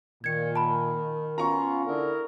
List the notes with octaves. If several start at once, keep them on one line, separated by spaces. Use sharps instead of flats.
A#2 D#3 G#6 C#7
A5 B5
B3 C#4 F4 A#5 C#6
D3 E4 G#4 A#4